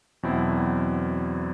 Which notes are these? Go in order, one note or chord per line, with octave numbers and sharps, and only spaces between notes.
E2 B2 F#3 C4 E4